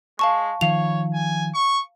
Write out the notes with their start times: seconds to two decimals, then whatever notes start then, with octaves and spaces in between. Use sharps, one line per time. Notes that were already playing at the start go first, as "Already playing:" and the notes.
0.19 G#3 F5 A5 C#6
0.61 D#3 F3 C#5 F5 F7
1.13 G#5
1.54 C#6